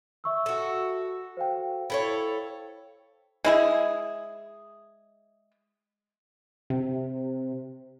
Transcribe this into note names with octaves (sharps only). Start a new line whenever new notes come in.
E5 C#6 E6
F#4 A4
C5 F5 G5
E4 A4 C#5
G#3 E4 G#4
C3